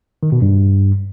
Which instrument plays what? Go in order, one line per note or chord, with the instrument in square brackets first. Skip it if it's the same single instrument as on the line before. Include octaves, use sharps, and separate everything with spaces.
[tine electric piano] D#3
B2
G2